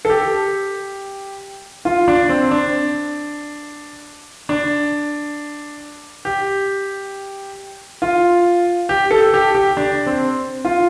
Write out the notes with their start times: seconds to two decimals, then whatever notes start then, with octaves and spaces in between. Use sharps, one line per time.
0.05 A4
0.10 G4
1.85 F4
2.08 D4
2.29 C4
2.51 D4
4.49 D4
6.25 G4
8.02 F4
8.89 G4
9.11 A4
9.34 G4
9.55 G4
9.77 D4
10.06 C4
10.65 F4